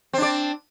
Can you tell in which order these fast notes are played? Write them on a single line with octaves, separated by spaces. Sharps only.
C4 D4 D5